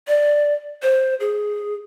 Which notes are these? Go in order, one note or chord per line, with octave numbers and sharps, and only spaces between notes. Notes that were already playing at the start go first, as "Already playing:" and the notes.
D5
C5
G#4